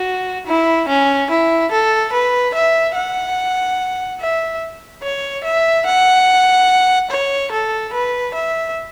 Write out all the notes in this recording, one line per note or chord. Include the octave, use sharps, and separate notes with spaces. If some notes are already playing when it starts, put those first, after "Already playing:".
Already playing: F#4
E4
C#4
E4
A4
B4
E5
F#5
E5
C#5
E5
F#5
C#5
A4
B4
E5